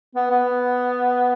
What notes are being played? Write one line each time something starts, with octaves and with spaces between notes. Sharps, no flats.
B3
B3